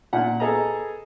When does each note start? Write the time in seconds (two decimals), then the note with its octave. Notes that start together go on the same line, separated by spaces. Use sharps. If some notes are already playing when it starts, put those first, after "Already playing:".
0.13 A#2 F#5
0.40 G#4 A4 B4 D#5 G#5 A#5